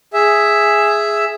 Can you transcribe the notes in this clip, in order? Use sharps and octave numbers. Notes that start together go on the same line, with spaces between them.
G#4 E5